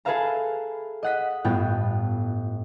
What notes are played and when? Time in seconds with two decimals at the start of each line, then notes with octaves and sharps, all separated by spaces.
0.05 G#4 A4 B4 E5 F5 A#5
1.03 D#5 F#5 B6
1.44 G1 A2 B3 F4 G5